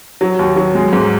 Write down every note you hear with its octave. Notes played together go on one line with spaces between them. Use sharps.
F#3
D#2
F#3
G#3
G#2